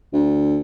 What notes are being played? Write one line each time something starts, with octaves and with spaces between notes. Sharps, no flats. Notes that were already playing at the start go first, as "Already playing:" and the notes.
D2